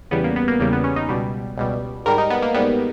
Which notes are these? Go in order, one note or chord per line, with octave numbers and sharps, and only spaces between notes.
E2 C#3 G3 B3
A#3
B3
A#3
E2 C#3 G3 A#3
B3
C#4
D#4
C#2 B2 G3
C#2 B2 G3
G#2 G3 A#4
D#4
B3
A#3
G#2 G3 B3